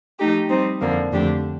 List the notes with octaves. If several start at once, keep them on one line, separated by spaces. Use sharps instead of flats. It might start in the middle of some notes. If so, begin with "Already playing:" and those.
F3 A3 D#4 G4
G3 C4 D#4
F2 D3 F3 A#3
F2 D3 A3 D4 G4